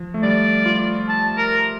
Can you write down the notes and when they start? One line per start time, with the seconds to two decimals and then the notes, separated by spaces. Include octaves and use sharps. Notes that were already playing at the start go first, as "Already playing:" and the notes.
Already playing: F3
0.14 A3
0.23 G3 D5
0.66 F4
1.08 A5
1.37 A#4